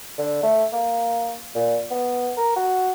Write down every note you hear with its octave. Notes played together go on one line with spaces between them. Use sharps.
D3
A3
A#3
A#2
B3
A#4
F#4